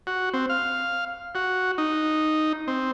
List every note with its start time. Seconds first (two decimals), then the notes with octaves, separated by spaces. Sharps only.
0.07 F#4
0.33 C4
0.49 F5
1.35 F#4
1.78 D#4
2.67 C4